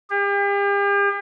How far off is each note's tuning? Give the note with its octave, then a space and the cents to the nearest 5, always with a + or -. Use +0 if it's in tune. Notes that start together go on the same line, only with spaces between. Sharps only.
G4 +40